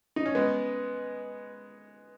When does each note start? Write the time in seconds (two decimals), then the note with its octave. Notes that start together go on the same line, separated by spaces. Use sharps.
0.16 D#4
0.26 C#4
0.35 G#3 B3